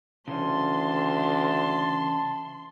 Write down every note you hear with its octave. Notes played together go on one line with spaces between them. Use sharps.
D2 C#3 E3 C#4 A5 C6